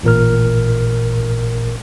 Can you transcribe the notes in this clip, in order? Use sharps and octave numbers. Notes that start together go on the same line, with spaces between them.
A1 A#2 A#4 F6